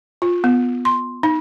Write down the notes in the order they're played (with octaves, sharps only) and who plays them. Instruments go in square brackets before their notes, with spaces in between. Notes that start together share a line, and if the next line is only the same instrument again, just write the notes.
[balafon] F4
B3
C6
D#4